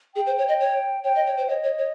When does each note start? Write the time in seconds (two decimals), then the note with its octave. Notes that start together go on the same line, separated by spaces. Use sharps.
0.15 G#4 G5
0.26 C5
0.38 C#5
0.48 D#5
0.60 C#5
1.04 C#5 G5
1.15 D#5
1.27 C#5
1.37 C5
1.49 C#5 D#5
1.63 C#5
1.78 C#5